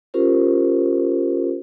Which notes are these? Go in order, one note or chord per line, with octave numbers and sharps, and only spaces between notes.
C#4 F4 G4 A#4 C5